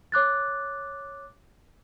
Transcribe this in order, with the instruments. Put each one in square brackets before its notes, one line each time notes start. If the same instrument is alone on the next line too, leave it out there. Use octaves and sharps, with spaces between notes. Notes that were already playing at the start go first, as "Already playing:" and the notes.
[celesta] C#5 D6 F#6 A6